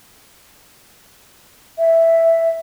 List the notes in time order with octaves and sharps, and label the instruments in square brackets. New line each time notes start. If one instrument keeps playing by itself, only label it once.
[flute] E5